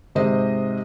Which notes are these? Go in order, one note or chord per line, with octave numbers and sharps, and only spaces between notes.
G#2 C3 C5 D#5